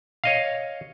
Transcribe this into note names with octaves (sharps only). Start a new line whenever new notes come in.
C#5 D#5 F5